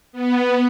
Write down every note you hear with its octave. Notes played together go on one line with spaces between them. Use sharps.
B3